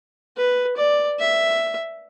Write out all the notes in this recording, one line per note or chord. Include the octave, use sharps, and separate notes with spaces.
B4
D5
E5